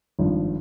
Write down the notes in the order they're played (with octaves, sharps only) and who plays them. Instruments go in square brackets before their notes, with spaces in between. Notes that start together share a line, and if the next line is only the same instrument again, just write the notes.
[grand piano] G#1 G2 F3